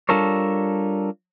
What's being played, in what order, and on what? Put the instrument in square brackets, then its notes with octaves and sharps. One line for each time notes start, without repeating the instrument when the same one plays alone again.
[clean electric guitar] G3 D4 F4 A4 A#4 C#5